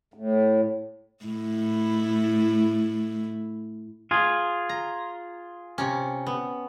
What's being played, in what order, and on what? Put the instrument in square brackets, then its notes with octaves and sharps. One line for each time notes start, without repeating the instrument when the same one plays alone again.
[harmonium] A2
[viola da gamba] A2 E4
[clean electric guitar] F4 G#4
[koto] A#5
C3 C#4
B3